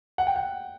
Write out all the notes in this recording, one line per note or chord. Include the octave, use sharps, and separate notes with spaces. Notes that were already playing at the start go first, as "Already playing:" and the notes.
F#5
G5
F#5